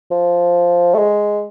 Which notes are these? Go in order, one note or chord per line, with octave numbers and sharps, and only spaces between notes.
F3
A3
G#3